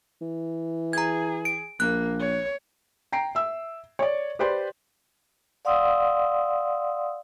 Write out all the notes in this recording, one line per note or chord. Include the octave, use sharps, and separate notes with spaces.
E3
G#4 A#5 G#6
D7
A#1 A#3 F#6
C#5
G5 A#5 C7 D7
E5 E6
C#5 D5
G4 B4 C5 D5 C6
D5 F5 F#5 C6 D#6 E6